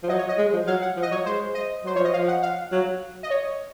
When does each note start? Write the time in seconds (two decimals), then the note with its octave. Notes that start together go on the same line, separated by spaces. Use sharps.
0.03 F3
0.09 F#3 D#5
0.18 C#5
0.29 D#5
0.38 G#3
0.53 F3
0.67 F#3 F5
0.82 F#5
0.97 F3
1.02 D#5
1.11 F#3 C#5
1.26 G#3 C5
1.55 D#5
1.84 F#3 C5
1.96 F3 C#5
2.05 D#5
2.13 F3 F5
2.28 F#5
2.42 F5
2.72 F#3
3.23 D#5
3.30 C#5